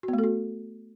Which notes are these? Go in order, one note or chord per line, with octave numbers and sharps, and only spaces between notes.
F#4
B3
A3
A4
F#4